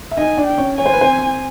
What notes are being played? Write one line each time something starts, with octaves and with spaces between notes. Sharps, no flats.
E5
D#4 D#5 G#5
D4 D5
G5
C#4 C#5
C#5 G#5
C5
B4
C4 C5